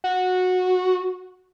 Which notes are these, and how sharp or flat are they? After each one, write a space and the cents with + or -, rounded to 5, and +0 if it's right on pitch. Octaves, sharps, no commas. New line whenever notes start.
F#4 -15